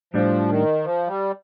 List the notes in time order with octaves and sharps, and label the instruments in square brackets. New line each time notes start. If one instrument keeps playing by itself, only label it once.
[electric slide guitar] A2 G3 D4 [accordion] F3
[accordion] D#3
F3
G3